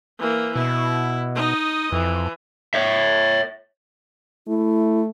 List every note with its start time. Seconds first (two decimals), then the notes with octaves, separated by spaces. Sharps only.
0.19 E3 A#3
0.56 B2 E4
1.35 D#4 D#5
1.92 F2 E3
2.74 C#5 E5
4.48 A3 E4